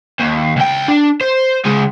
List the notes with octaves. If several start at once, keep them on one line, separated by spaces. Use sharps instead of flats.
D#2
C#2 G5
D4
C5
C#3 G#3